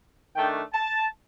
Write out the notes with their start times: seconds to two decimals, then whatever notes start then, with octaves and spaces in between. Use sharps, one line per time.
0.36 D#3 A3 D4 G5
0.74 A5